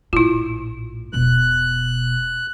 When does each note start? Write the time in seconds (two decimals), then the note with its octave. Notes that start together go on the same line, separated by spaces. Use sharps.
0.13 A#1 A2 E4 F4
1.13 E1 B2 F#6